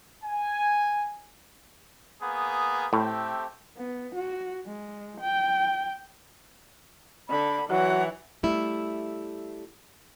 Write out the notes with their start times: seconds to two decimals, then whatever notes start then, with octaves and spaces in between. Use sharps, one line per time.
0.24 G#5
2.22 A#3 B3 G#4
2.93 A2 A3 C4 G4
3.77 B3
4.15 F#4
4.67 G#3
5.21 G5
7.29 D3 B5
7.70 E3 F#3 F#5
8.43 G3 A3 E4